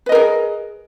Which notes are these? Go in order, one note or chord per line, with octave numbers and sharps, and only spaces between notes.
G#4 A#4 B4 D#5